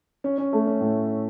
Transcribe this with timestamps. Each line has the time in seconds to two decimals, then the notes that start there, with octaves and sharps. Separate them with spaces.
0.24 C#4
0.38 C#4
0.53 A3
0.67 C#4
0.80 A2